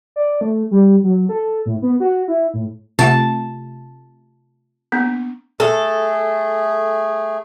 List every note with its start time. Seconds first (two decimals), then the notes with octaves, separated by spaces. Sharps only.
0.16 D5
0.41 A3
0.71 G3
1.04 F#3
1.29 A4
1.66 A2
1.82 B3
2.00 F#4
2.28 E4
2.54 A2
2.99 C3 A3 F4 F#5 A5
4.92 A#3 B3 D4
5.60 A3 G#4 A4